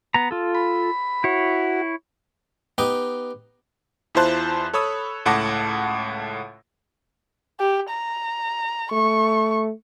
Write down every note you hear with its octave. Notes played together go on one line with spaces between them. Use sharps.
B3 A#5
F4 A4
B5
E4 F#4 C#5
B3 D#4 G4 D#5 G5
E2 E4 F4 C5 A5 F#6
A4 C#5 B5 D#6 E6
C#2 A2 F#5 A5 D6 A#6
G4
A#5
A3 C#6